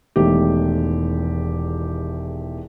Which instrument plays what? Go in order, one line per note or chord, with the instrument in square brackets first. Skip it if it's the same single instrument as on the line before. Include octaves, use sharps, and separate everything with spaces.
[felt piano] E1 E2 D#3 A3 G4